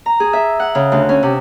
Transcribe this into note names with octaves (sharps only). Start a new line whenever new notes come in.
A#5
G#4
E5
F#5
C#3
D2
C#4
C3